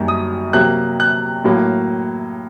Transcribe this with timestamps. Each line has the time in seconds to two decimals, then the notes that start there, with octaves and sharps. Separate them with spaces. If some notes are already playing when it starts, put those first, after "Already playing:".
Already playing: F#2 D#3 G3 A#3
0.08 D#6
0.53 C3 F#3 A#3 F#6
1.00 F#6
1.44 A2 F#3 A#3